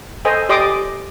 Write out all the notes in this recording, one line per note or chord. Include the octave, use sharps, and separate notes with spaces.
A4 C5 D#5 G#5
G4 D5 D#5 C6 D6 D#6